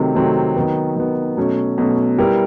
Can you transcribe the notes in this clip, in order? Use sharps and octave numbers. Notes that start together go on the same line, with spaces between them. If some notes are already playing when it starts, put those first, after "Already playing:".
Already playing: C3 D#3 F#3 A3 C4
C3 D#3 F#3 A3 C4
D#3 F#3 B3
D#3 F#3 B3
B2 F#3 A3 C#4
B2 F#3 A3 C#4
G3 B3 E4 G4 A#4